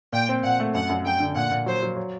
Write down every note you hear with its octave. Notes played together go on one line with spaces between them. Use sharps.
A#2 G5
C4
A#2 F#5
A3
F#2 F#5
F#2
F#2 G5
D3
A#2 F#5
A#2
F#3 C5
F#3
F#3